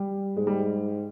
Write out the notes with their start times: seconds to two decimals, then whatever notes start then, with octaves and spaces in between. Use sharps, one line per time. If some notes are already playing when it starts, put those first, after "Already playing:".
Already playing: G3
0.35 G#2 G#3
0.47 G3